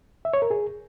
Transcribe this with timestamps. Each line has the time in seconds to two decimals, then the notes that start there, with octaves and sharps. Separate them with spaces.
0.25 E5
0.33 C#5
0.42 A#4
0.50 G#4